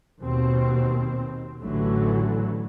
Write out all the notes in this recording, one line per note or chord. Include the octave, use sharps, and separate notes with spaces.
D#2 B2 C4
A1 D3 E3 F#3 A3